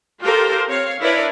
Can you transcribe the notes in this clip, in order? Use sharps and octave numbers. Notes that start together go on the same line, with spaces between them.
F4 G4 A4 A#4 C5
C4 C#5 F5
D4 E4 A#4 B4 C#5 D5